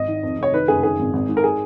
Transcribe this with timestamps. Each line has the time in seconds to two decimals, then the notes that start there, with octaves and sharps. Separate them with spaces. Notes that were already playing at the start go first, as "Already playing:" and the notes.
Already playing: G#1 D#5
0.08 D#3
0.23 F2
0.38 F1 C#5
0.53 D#3 B4
0.68 F#1 G#4
0.83 D#3 G#4
0.99 G#1
1.13 G#1
1.29 G#2
1.37 A#4
1.44 G#4